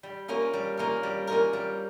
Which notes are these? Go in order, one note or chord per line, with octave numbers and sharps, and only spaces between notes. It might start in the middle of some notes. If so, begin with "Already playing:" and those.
G3
A#3 C#4 F4 A#4
G3
A#3 C#4 F4 A#4
G3
A#3 C#4 F4 A#4
G3